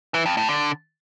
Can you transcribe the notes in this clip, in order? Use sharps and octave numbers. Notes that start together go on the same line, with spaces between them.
E3
F2
A2
D3